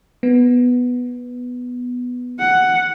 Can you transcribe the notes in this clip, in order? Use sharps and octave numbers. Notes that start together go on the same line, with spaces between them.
B3
F#5